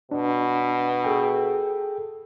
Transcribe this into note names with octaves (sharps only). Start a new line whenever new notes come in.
B2 D4
G#4 A4 G5